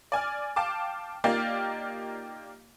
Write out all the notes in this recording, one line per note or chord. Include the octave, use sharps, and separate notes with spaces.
D5 G#5 F6
F5 G5 A5 D6
A#3 D#4 F4 G4 D5 F5